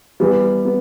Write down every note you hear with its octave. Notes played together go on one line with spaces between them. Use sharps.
E3 G3 B3
B3